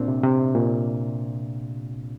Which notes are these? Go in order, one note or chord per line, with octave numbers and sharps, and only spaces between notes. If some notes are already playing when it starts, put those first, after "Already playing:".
Already playing: A#2 C4 D4
C3
C3
A#2